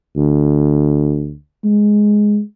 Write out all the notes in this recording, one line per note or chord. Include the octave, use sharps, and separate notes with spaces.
D2
G#3